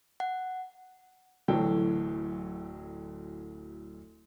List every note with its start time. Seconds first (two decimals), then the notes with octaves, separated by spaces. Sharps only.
0.20 F#5
1.48 D1 D2 E3 F#3 A4 G5